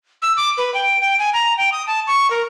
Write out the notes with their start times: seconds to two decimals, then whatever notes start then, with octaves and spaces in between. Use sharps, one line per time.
0.22 E6
0.37 D6
0.58 B4
0.74 G5
1.01 G5
1.19 G#5
1.34 A#5
1.58 G5
1.72 D#6
1.87 A5
2.07 C#6
2.31 A#4